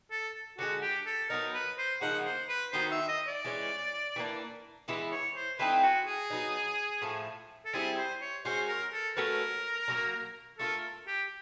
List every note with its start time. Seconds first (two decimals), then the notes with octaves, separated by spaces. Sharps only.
0.11 A4
0.58 D3 F3 G#3 F#4
0.82 G4
1.06 A4
1.30 F#3 B3 D#4 A#4
1.54 B4
1.78 C5
2.01 C#3 F3 A#3 D#4 F#5
2.26 C5
2.49 B4
2.73 D#3 F#3 B3 D#4 C5
2.91 E5
3.09 D#5
3.27 D5
3.44 E3 G#3 C#4
4.16 E3 G3 A#3 D4
4.88 E3 G#3 B3 E4
5.12 C#5
5.36 C5
5.59 E3 A3 C4 D#4 B4
5.83 F#4
6.06 G#4
6.30 F#3 B3 D#4
7.02 A2 F3 A3
7.65 A4
7.74 G3 C4 E4 G#4
7.98 C5
8.22 C#5
8.45 G#3 C#4 F#4 C5
8.68 A#4
8.93 A4
9.16 A3 C#4 F#4 A#4 B4
9.88 D3 F#3 A#3
10.59 A3 D4 F4 A4 A#4
11.07 G4